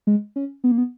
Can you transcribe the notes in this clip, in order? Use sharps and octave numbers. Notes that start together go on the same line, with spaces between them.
G#3
C#4
B3
A#3
B3